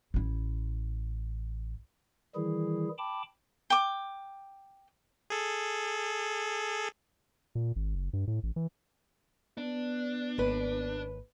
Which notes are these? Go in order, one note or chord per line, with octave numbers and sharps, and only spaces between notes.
A1 E4
D#3 E3 G3 E4 G#4
G5 A5 B5 D6
G5 D6
G#4 A4
A#2
G#1
F#1
G2
A2
A1
E3
B3 D4
G#1 D#2 B4